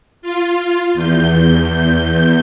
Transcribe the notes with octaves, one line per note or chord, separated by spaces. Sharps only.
F4
E2 G6